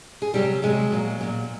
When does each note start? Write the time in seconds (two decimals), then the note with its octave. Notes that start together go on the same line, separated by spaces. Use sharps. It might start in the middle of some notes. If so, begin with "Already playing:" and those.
0.22 G#4
0.34 C3 D#3 F#3 G3 G4
0.62 C3 D#3 F#3 G#3 G#4
0.92 A#2 F#3
1.21 A#2 F#3